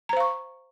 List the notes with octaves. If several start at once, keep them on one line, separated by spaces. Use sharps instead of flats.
C5 F5 A#5 C#6